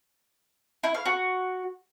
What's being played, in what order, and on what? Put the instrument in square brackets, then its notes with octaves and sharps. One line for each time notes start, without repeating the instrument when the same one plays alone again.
[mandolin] E4
F5
F#4